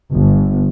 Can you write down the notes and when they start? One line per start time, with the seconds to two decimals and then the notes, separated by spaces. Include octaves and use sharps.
0.14 G1